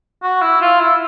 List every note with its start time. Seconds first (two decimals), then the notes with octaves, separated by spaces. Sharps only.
0.23 F#4
0.42 E4
0.61 F4
0.80 E4